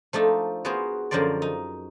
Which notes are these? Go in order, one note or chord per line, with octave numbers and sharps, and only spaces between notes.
F3 A3 D4 D#4
B3 F#4 G#4 A#4 C5
F#2 D3 F3 A#4 C5 D5
D#4